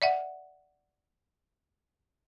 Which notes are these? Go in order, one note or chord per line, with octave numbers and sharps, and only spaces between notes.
D5 E5 F#5